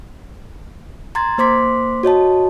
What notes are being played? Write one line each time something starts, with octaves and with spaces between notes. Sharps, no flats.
A#5 C6 G#6 A6
A#3 C5 C6 D6 B6
F#4 C#5 D#5 A5